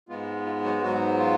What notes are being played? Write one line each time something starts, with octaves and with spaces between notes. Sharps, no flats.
G#2 G#3 B3 F4
F4
F#3 F#4
G#2 F#3 B3 F#4
F4